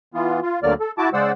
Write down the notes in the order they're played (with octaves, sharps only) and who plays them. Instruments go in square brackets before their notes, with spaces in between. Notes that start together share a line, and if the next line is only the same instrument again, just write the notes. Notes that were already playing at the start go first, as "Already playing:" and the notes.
[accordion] E3 B3 F4
F4
D2 D3 F#3 A#3 D5 F6
A4
E4 F#4 A5 D6
C#3 G#3 C5 D5 F#5 E6